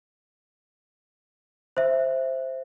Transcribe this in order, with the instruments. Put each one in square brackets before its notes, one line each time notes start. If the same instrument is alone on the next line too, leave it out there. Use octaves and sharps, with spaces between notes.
[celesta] C5 E5